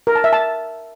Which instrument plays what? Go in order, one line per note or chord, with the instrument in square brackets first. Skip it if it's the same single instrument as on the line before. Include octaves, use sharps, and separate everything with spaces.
[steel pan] A#4
A5
E5
A5